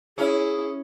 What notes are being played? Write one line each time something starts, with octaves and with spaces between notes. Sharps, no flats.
C#4 E4 G#4